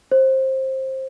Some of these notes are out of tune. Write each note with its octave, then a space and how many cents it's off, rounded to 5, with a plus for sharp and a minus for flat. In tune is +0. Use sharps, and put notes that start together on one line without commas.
C5 +20